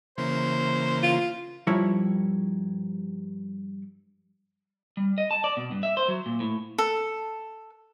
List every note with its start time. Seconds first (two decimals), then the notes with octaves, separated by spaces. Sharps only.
0.18 C#3 E3 A#3 C5
1.03 F4
1.67 G2 F3 G3 E4 A#4 C#5
4.97 G3
5.18 D#5
5.31 A5
5.44 D5
5.57 B2
5.71 G2
5.83 E5
5.97 C5
6.08 F#3
6.26 A#2
6.40 A2
6.78 A4